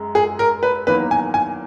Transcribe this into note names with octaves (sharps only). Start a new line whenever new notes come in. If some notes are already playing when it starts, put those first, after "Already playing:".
Already playing: F#2 G#3
G#4
A#4
B4
E2 D#3 F#3 A#3 B4
G#5
G#5